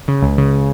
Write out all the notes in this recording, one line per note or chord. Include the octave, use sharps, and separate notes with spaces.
C#3
C#2
C#3